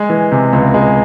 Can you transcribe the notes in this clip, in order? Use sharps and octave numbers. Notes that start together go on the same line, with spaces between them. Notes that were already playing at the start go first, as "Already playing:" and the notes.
Already playing: G#3
E3
C3
C#2
G#3